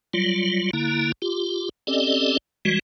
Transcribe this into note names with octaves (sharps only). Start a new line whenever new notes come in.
F#3 G3 F4
D3 A#3 E4 A#5
F4 G4
C4 C#4 G4 A4 D5 D#5
E3 G3 G#3 F#4